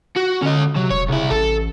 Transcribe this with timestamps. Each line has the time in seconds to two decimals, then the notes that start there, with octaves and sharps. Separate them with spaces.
0.17 F#4
0.42 D3 C#4 D#5
0.76 C3 F#3
0.91 E1 C#5
1.09 C2 C#3 E4
1.31 A1 A4